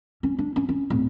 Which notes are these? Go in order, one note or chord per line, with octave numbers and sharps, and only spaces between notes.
C#4
D4
C#4
C#4
D1